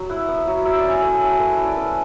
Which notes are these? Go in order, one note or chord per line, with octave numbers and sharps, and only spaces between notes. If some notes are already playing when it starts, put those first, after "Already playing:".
Already playing: F#3
E4 F#5
B3
F#3
F#3 E5
D5
C#4
E5
A3 G#5
F#5
F#3
A3 B4
E4 C#5
D5
C#4 B4